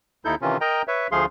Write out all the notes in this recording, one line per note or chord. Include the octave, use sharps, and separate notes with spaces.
D#2 D#4 E4 A4 G6
C3 D#3 E3 C#4 F4
A#4 D#5 G5 A#5
B4 C#5 E5
D2 F3 A3 G#4 F5 C6